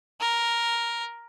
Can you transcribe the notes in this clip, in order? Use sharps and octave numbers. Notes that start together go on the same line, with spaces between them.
A#4